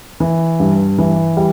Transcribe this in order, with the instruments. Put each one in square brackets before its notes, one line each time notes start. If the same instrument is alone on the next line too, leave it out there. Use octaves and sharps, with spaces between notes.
[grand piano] E3
G2
E3
G3